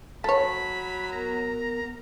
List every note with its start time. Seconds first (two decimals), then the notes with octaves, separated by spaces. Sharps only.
0.24 F#3 A4 C#5 B5
1.12 B3 A#4 A#5